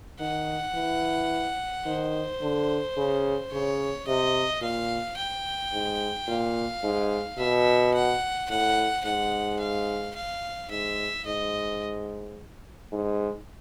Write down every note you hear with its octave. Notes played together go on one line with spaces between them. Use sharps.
D#3 F#5
E3
D#3 C5
D3
C#3
C#3 C#5
C3 D#5
A#2 F5
G5
G#2
A#2 F5
G#2
B2 E5
F#5
A2 F#5
G#2 F#5
F5
F5
G#2 E5
G#2 D#5
G#2